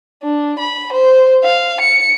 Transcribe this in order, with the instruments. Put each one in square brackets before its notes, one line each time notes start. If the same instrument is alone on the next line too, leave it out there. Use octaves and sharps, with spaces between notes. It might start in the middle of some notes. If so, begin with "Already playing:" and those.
[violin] D4
B5
C5
F5
C#7